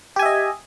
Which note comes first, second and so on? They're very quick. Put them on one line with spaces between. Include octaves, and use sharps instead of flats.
G4 G#5 E5 D#5